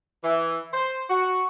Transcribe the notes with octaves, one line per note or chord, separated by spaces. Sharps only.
E3
C5
F#4